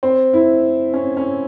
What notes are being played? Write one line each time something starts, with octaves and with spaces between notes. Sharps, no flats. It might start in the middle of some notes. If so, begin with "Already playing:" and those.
C4
E4
C#4
C#4